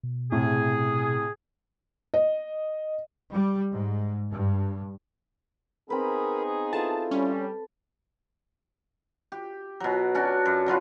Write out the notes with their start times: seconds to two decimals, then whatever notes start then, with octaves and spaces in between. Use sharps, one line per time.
0.03 B2
0.32 A2 C3 G#4
2.14 D#5
3.32 G3
3.73 G#2
4.30 G2
5.90 B3 C4 D#4 G#4 A#4 B4 B5
6.73 E4 F4 A4 A5
7.11 G3 C#4 B4
9.32 G4
9.80 B2 F#3
10.15 C#4 D4 F#4
10.46 F#2
10.66 D3 F#3 F4 B4